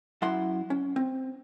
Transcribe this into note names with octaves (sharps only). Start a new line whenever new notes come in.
F#2 E4 F#5 C6
C#4
C4